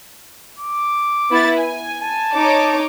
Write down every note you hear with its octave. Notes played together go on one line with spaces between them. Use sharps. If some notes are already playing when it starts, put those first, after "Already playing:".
D6
B3 E4 A6
G#5
A5
D#4 C#5 D6